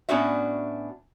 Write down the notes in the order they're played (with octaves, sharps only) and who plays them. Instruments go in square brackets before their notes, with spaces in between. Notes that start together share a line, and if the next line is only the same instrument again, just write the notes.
[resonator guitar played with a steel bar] A2 B3 C#4 D4 F#4 E5